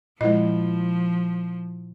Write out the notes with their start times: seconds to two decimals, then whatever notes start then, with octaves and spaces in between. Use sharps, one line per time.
0.21 A#2 F3 G#3 E4 D#5